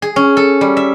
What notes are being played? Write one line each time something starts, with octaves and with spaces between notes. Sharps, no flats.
G#4
C#4
A4
G3
E5